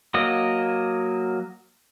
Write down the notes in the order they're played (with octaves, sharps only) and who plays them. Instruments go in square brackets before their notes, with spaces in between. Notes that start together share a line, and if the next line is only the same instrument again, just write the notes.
[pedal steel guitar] F#3 A#3 D#5